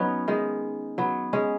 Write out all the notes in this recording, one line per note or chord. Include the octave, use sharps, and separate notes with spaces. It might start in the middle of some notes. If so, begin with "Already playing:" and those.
Already playing: F#3 B3 C#4 D#4
D#3 G#3
F#3 B3
G#3 C#4